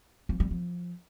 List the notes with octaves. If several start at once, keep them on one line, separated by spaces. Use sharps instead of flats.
F3
G3
F3